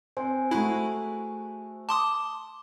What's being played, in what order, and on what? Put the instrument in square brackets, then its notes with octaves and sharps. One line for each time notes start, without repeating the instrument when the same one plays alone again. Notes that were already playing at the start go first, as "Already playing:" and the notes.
[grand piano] C4 [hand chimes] C5 G#5
[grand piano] A3 F#4 [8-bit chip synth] E4 [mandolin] G#4 B4 A#5
[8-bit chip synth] A5 C6 D#6 [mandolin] D6